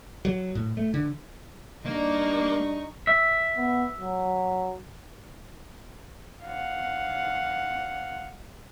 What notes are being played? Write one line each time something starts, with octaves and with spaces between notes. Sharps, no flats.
F#3
A2
A3
D3
G2 G3 A#3 D4 D#4 C#6
E5
B3
F#3
F5 F#5